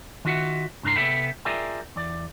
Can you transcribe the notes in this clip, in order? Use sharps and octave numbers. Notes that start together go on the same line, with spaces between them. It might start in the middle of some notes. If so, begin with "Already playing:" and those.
D#3 F4 F#4 E5 F#5
C2 G2 D4 A#4 A#5 C6
C3 B3 A4 E5 G5 B5
F4 G#4 A#4 D5 E5 G5
E2 D5